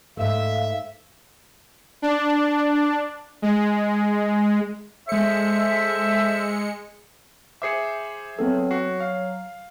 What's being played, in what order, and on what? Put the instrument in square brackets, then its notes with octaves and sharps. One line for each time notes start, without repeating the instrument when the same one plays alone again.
[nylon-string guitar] G#2 A3 [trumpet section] E5 [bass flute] F5
[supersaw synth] D4
G#3
[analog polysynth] G#3 C#7 [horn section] A4 C5 E5
[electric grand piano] G#4 C5 E5 [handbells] D6 C7 C#7
[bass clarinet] F#3 [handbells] B3 C4 A4
[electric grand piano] F#4 [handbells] C7
[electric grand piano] F5